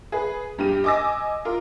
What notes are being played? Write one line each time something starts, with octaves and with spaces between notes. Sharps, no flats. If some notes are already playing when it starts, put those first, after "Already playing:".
G#4 B4
G2 G3 G4 D#7
D#5 G#5 D6 E6 A#6
F4 A#4